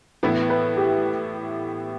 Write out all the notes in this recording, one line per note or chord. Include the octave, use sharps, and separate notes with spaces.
A2 E3 B3 E4 B4
B4
G4